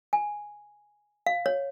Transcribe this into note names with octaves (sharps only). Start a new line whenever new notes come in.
G#5
F5
C#5